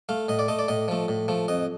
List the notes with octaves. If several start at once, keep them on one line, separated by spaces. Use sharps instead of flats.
A3 F5
A2 D#5
D5
A3 D#5
D5
A2 D#5
F3 A3
A2
F3 A3
F2 D#5